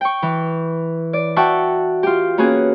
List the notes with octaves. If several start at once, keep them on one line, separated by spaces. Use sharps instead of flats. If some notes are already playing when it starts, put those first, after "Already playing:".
G5 C#6
E3
D5
F#4 E5 F#5 G5 A5 C#6
F4 G4
A#3 B3 C#4 F#4 G#4